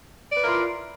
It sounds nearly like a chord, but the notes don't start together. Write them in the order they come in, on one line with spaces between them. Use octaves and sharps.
D5 B4 A#4 E4 F4